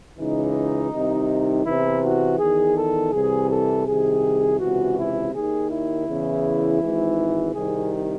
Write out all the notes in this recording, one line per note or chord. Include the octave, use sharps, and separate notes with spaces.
C#2 C#3 E3 D#4
C2 C3 D#3
E2 C3 E3 E4
F#4
E2 D#3 G#4
A4
C2 C3 E3 G#4
A4
C2 C3 D#3 G#4
C#2 C3 E3 F#4
E4
D#2 D#3 G#4
E4
E2 C#3 E3
G#1 G#2 E3
C2 C3 D#3 G#4